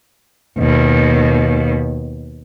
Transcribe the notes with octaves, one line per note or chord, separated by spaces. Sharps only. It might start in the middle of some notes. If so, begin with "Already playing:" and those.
D#2 B2